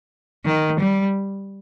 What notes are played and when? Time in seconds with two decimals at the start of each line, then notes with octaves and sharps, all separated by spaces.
0.46 D#3
0.80 G3